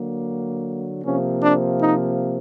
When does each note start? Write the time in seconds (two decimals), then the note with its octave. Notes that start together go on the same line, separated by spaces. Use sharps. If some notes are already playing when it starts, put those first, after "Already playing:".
Already playing: D3 F#3 A#3
1.04 C3 F3 A#3 C#4
1.42 D4
1.80 D#4